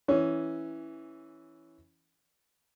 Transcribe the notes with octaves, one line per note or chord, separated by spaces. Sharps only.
E3 C#4